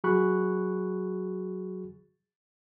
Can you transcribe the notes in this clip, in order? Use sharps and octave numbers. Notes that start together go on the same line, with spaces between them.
F#3 F#4 G#4 B5 C#6 F#6